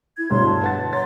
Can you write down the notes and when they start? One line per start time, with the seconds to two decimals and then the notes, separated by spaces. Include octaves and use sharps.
0.16 E4 G#6
0.30 D2 G2 B2 C#5 A#5 C6
0.44 A5
0.62 B4 F#5 A6
0.93 C#5 A#5 C6 A6